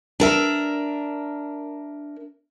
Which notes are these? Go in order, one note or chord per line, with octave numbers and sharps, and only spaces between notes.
D4 A#4 E5